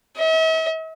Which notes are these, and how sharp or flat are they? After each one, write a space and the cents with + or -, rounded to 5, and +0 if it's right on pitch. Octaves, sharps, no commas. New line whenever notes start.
E5 -45